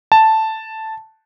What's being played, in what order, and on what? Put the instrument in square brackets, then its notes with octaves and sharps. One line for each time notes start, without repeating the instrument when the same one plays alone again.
[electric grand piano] A5